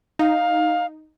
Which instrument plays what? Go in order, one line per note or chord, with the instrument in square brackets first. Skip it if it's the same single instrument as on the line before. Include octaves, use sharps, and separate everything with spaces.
[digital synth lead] D#4 [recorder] F5